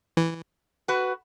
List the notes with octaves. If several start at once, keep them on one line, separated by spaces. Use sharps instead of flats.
E3
F#4 B4